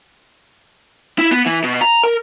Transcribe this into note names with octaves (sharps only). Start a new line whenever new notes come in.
E4
B3
E3
B2
A#5
A#4